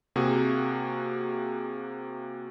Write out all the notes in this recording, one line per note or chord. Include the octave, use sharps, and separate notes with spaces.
C3 A#3 F#4 G#4